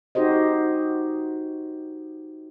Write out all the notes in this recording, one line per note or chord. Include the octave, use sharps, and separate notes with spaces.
D#4 F#4 G4 C5 D#5